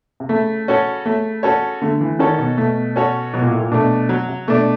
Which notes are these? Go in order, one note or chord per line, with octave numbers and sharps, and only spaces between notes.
C3
C#3 A3
C#4 F#4 A4 C#5
A3
C#4 F#4 A4 C#5
D3 A3
E3
D#3 C#4 F#4 A4 C#5
B2
B2 A3
C#4 F#4 A4 C#5
B2 F#3
A#2
A2
A#2
B2 A3 D4
F#3
C3
B2 A3 D4